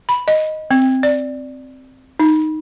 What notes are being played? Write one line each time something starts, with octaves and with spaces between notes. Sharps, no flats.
B5
D#5
C4
D5
D#4